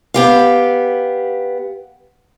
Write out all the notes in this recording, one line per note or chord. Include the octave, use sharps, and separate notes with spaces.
B3 G4 F5